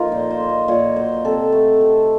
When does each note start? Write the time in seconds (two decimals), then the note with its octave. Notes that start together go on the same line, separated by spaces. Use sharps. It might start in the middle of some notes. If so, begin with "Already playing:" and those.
Already playing: F3 A#3 D#4 F4 A#4
0.12 A#2 C5
0.31 C5
0.40 A#3
0.49 D#5
0.68 A#2 C#5
0.96 F#3 C5
1.25 C3 A4
1.52 A3
1.81 C3